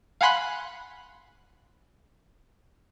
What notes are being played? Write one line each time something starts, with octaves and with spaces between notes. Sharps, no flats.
F5 F#5 G#5 B5 C6 F#6